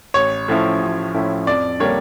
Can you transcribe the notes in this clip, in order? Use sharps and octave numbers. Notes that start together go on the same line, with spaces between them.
A1 C#5
A2 F3 C#4 E4
A1
A2 F3 C#4 E4
F2 D5
D3 G3 A#3 D4 C#5